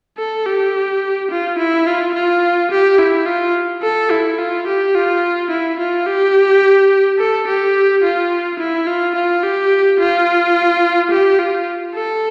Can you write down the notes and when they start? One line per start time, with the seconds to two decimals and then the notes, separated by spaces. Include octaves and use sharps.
0.18 A4
0.46 G4
1.31 F4
1.58 E4
1.87 F4
2.15 F4
2.71 G4
2.99 E4
3.26 F4
3.83 A4
4.11 E4
4.38 F4
4.67 G4
4.95 F4
5.50 E4
5.79 F4
6.06 G4
7.19 A4
7.47 G4
8.03 F4
8.59 E4
8.87 F4
9.15 F4
9.43 G4
10.00 F4
11.11 G4
11.39 F4
11.95 A4